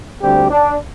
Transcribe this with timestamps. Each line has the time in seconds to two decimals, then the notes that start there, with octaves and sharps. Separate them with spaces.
0.22 D2 D3 G3 C4 G4
0.50 D4